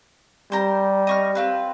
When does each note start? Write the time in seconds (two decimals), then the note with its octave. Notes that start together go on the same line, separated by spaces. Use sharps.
0.52 G3 A#4 C5
1.07 D#5 C#6 F6
1.35 C4 F4 B4